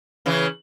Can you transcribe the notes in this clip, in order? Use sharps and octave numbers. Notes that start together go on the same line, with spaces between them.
C#3 E3